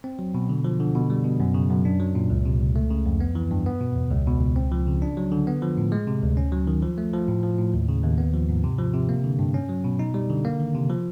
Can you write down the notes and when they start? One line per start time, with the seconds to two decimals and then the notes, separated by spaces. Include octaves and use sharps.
0.04 C4
0.19 F#3
0.34 B2
0.49 D3
0.64 F3
0.80 D3
0.95 B2
1.10 G3
1.25 B2
1.40 F#2
1.54 C#3
1.70 F#2
1.85 D4
2.00 F#3
2.15 A#2
2.30 C#2
2.46 C3
2.60 C#2
2.76 A3
2.90 C#3
3.06 F2
3.20 B3
3.35 E3
3.51 G2
3.66 B3
3.81 B2
3.96 E2
4.11 C#2
4.27 B2
4.41 C#2
4.56 C4
4.72 F3
4.87 C#3
5.02 D4
5.17 F#3
5.32 D3
5.47 B3
5.62 F3
5.77 A2
5.92 G#3
6.07 C3
6.23 D2
6.37 C#4
6.52 F#3
6.67 D#3
6.82 F3
6.98 A3
7.13 F3
7.28 A2
7.43 F3
7.58 A2
7.74 D#2
7.89 C#3
8.04 D#2
8.18 B3
8.34 F3
8.49 G#2
8.64 C3
8.78 F3
8.94 C3
9.09 A#3
9.24 D3
9.39 G2
9.54 C#4
9.69 F#3
9.84 B2
9.99 D#4
10.14 G3
10.30 D3
10.45 A#3
10.60 D#3
10.75 C3
10.90 F3